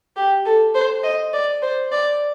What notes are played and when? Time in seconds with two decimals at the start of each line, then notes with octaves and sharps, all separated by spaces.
0.17 G4
0.46 A4
0.75 C5
1.04 D#5
1.33 D5
1.62 C5
1.92 D5